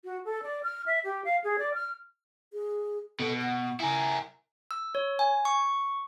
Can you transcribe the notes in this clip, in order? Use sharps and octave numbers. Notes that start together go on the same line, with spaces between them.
F#4
A4
D5
F6
E5
G4
F5
G#4
D5
F6
G#4
B2 A4
F#5
E4 A#4 G#5
E6
C#5
G#5
C#6